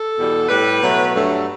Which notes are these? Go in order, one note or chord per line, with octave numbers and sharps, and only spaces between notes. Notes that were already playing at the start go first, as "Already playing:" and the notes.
Already playing: A4
E2 B2 G3
A2 G3 B4
B2 F#3 A3
G2 F#3 A3